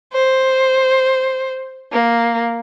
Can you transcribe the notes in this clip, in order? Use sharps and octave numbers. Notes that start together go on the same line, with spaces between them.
C5
A#3